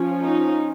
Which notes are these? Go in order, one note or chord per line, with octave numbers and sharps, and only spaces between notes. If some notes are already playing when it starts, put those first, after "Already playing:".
Already playing: F3 C#4
D#4